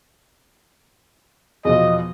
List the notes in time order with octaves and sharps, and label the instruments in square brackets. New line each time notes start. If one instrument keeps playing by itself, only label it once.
[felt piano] E2 B2 F3 [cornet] D#5